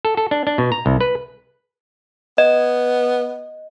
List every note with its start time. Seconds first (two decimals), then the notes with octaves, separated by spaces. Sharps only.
0.05 A4
0.17 A4
0.31 D4
0.47 D4
0.58 B2
0.72 A#5
0.86 C2
1.01 B4
2.38 B3 D#5